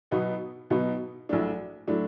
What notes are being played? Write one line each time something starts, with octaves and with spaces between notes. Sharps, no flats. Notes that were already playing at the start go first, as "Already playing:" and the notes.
B2 F#3 B3 D#4
B2 F#3 B3 D#4
A#1 A2 F#3 A3 D4
A2 F#3 A3 D4